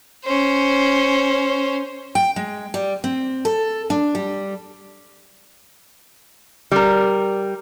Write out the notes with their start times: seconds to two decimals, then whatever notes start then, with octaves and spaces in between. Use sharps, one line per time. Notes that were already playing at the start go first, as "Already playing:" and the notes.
0.24 C#4 C5
2.15 G5
2.36 G#3
2.74 G3
3.04 C4
3.45 A4
3.90 D4
4.15 G3
6.72 G3 A#4